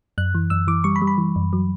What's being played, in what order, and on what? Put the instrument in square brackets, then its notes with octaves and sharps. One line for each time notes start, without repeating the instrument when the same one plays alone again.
[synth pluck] F#2 F#6
E3
F#2 E6
E3 D6
G3 C#6
B5
G3
B5
E3
F#2
F#3